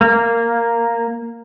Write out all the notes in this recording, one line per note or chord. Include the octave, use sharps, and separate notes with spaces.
A#3